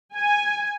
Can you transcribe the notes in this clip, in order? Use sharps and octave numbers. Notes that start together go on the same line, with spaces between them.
G#5